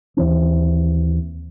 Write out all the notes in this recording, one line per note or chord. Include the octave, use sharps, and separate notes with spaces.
D#2 E3 C4